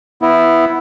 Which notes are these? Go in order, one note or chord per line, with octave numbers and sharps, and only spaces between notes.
B3 E4